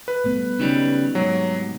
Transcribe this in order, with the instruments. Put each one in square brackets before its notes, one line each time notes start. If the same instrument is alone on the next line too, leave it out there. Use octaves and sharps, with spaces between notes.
[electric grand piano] B4
[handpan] G3 A3 B3
[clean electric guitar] C#3 F#3 G3 [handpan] D#4
[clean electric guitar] G#2 C3 [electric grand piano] F#3